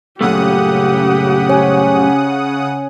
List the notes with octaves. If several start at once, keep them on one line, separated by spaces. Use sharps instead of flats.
F#2 A#2 C#3 A3 G4 F#5 D#6
C#4